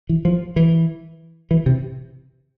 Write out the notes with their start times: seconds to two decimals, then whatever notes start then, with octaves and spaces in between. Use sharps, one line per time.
0.09 E3
0.25 F3
0.56 E3
1.51 E3
1.66 C3